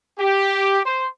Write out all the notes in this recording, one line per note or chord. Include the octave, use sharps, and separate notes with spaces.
G4
C5